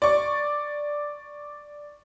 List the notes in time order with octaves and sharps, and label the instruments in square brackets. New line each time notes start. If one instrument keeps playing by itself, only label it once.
[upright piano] D5 C#6